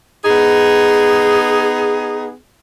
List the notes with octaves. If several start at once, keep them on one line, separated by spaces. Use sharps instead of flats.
B3 D#4 G#4